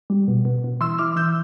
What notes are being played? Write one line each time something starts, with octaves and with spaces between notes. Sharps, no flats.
G3
B2
B2
B2
E3 C6 E6
E3 D6 F6
E3 E6 G6